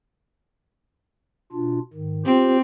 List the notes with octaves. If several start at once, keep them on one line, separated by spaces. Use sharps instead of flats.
B2 D4 F4
G#2 D#3
C4 F4 G4 C5